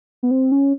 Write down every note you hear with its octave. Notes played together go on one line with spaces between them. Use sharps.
B3
C4
C#4